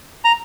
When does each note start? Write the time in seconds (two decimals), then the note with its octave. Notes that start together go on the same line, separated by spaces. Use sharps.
0.25 A#5